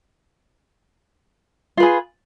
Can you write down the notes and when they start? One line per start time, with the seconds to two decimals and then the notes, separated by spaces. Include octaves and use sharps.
1.77 F4
1.80 B4
1.83 G#4